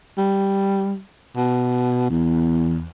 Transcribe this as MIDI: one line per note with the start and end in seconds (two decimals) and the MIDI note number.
0.18 1.00 55
1.36 2.05 47
2.10 2.87 40